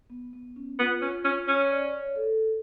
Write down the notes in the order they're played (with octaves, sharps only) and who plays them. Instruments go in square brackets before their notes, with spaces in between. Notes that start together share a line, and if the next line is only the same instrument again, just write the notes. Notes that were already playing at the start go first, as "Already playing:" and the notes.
[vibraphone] B3
B3
C#4
[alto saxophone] B3 [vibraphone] F4
[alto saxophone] C#4
C#4
[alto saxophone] C#4 [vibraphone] C#5
[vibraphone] D5
C#5
A4